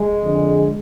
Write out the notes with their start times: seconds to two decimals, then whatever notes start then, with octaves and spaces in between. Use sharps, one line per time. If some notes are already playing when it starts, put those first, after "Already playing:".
Already playing: G#3
0.23 F2 D3